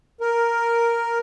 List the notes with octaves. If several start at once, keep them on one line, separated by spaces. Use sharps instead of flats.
A#4